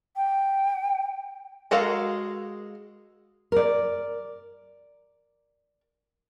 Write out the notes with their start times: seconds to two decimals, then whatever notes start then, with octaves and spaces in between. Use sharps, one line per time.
0.16 G5
1.71 G#3 F#4 A4 A#4 F5
3.52 A#4 D5